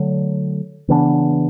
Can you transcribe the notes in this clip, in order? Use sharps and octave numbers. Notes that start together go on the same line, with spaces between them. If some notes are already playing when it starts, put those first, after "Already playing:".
Already playing: D3 F#3 A3
C#3 E3 B3 D4